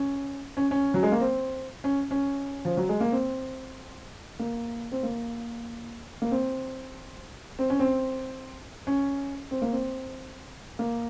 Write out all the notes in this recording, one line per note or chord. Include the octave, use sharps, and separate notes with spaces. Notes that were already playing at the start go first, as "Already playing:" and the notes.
Already playing: C#4
C#4
C#4
F#3
G#3
A#3
C4
C#4
C#4
F3
F#3
G#3
A#3
C4
A#3
C4
A#3
A#3
C4
C4
C#4
C4
C#4
C4
A#3
C4
A#3